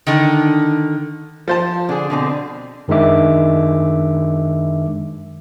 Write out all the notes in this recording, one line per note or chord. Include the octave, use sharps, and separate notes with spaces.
D3 D#3
F3 C5 A5
D3 G#4
B2 D3 C4
F#2 D#3 G#3 D4 E5 D6